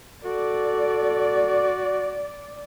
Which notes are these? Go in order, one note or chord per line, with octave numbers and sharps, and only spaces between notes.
F#4 A4 D5